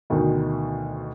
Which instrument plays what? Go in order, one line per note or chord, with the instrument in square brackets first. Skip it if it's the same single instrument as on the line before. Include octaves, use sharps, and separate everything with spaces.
[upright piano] D2 B2 D#3